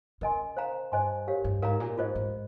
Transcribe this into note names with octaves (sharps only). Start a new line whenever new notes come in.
C#3 A#4 D#5 G#5 C6
C5 F5 A#5
G2 C5 D#5 G#5 C6
G4 A#4 C#5 F5
G2
G#2 A#4 F5 A#5
A#2
G#2 F4 C5 D#5
G#2